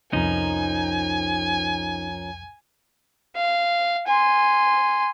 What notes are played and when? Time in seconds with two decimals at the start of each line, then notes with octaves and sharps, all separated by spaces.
0.13 C2 F2 F3 C#4 D#4 A#4 G#5
3.36 F5
4.07 G#5 C6